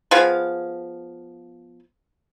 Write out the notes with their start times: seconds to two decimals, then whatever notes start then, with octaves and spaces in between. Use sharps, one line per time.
0.11 F3 B3 G#4 F5